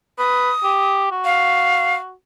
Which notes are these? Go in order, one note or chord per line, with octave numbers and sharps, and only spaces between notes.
B4 D#6
G4
F#4
F5